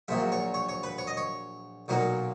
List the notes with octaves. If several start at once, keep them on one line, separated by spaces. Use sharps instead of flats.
A#1 A#2 F#3 E5
C#5
C#5
C#5
B4
C#5
D#5
C#5
B1 A#2 F#3 A#3